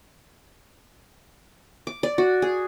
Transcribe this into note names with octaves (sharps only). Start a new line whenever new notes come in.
D6
D5
F#4
G#4